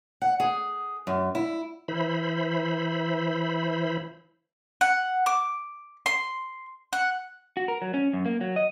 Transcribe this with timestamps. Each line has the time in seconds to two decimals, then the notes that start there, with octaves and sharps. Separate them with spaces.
0.22 F#5
0.40 G#4
1.07 F#2
1.35 E4
1.88 E3 E4 C5 B5
4.81 F#5
5.26 D6
6.06 C6
6.93 F#5
7.57 F#4
7.68 A#4
7.82 F#3
7.94 C#4
8.13 F#2
8.26 A#3
8.41 F#3
8.56 D#5